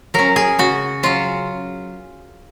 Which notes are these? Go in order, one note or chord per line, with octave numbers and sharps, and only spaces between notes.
F#3 C#4 A#4
G#4
C#3 F#4
F#3 C#4 F4